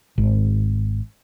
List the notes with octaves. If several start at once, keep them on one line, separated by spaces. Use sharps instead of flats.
G#1